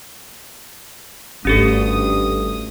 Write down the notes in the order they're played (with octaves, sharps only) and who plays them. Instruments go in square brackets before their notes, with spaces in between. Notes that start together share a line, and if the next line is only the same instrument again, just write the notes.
[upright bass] G#1 [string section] D2 D#6 [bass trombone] G2 [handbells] C#4 G4 A4